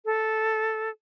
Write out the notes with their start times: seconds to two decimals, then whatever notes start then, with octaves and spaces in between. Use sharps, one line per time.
0.05 A4